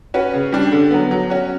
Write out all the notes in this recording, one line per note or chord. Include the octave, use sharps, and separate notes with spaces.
C#4 F#4 B4
C#3
G3 D4
D3
F#3 B3
F#3
C#4 F#4